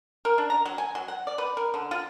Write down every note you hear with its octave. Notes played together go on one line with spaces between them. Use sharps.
A#4
D4
A#5
F#3
G#5
F#3
F#5
D5
B4
A#4
D3
F4